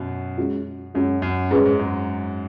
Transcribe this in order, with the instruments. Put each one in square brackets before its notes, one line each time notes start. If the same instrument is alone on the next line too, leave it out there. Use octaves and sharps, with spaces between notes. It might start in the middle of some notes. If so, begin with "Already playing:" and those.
Already playing: [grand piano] F#2 B2
[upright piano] G#3 C#4 F#4
[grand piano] F#2 [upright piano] G#3 C#4 F#4
[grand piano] F#2
[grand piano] G#2 [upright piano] G#3 C#4 G#4 B4
[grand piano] G#2
F#2